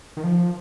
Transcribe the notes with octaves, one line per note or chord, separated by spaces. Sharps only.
D#3
F3